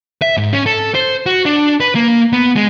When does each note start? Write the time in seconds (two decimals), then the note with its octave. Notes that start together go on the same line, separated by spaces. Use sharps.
0.22 E5
0.37 G#2
0.53 C#4
0.66 A4
0.95 C5
1.26 F#4
1.46 D4
1.80 B4
1.95 A#3
2.33 B3
2.56 G#3